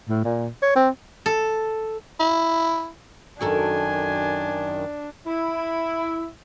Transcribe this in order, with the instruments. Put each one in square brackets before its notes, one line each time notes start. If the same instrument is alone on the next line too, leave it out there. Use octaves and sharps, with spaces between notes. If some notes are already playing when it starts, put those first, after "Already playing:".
[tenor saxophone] A2
A#2
C#5
C4
[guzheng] A4
[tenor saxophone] E4
[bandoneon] F#2 D#3 [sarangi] D4 [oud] F#4 A4 A#4 [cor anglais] G#5
[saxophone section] E4